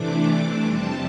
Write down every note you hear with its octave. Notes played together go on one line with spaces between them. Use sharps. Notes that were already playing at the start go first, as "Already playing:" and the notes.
Already playing: C3 E3 A3 D4 D6
F2 C3 G3 C4 A5